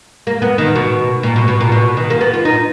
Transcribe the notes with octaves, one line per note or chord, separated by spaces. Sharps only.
A#3
B3
D#3
B2
A#2
B2
B2
A#2
B2
D#3
A#3
B3
F4
D#4